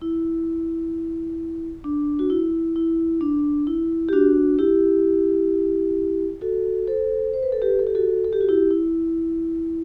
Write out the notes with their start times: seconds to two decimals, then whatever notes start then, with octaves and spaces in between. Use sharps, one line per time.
0.02 E4
1.84 D4
2.19 F#4
2.30 E4
2.76 E4
3.21 D4
3.67 E4
4.09 G4
4.13 D4 F#4
4.59 E4 G4
6.41 F#4 A4
6.87 A4 C5
7.33 C5
7.43 B4
7.52 A4
7.62 G4 B4
7.79 A4
7.87 G4
7.95 F#4 A4
8.24 A4
8.33 G4
8.41 F#4
8.49 E4 G4
8.71 E4